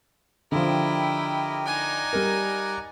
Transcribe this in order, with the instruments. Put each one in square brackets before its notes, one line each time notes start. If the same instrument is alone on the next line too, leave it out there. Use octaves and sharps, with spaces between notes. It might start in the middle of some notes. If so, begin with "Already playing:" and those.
[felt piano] D3 F3 [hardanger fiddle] E4 G5 [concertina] G4 A#4 D#5
[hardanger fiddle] D#4 G#5 [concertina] D5 F#5 A#5
[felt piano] G3 A#4